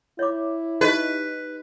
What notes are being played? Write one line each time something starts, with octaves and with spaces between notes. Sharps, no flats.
E4 C#5 D6
D#4 G4 B4 D#5